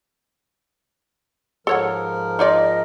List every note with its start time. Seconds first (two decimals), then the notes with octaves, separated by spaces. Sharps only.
1.67 G#2 F3 A4 A#4 C#5 F#5
2.39 D#4 F4 D5 D#5